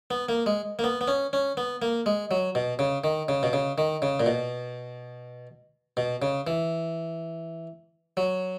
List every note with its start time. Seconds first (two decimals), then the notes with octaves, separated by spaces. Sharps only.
0.11 B3
0.29 A#3
0.46 G#3
0.79 A#3
0.84 B3
1.01 B3
1.08 C#4
1.33 C#4
1.57 B3
1.82 A#3
2.06 G#3
2.31 F#3
2.55 B2
2.79 C#3
3.04 D#3
3.28 C#3
3.43 B2
3.53 C#3
3.78 D#3
4.02 C#3
4.20 A#2
4.26 B2
5.97 B2
6.22 C#3
6.47 E3
8.17 F#3